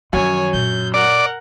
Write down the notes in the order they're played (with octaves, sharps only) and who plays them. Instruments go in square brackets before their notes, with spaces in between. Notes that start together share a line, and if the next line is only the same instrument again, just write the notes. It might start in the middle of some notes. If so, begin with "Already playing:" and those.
[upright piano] F#2 [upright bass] D#3 F3 [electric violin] C#5 G#5
[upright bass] A#2 [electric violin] G6
[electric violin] A#4 F#5 [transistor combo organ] D5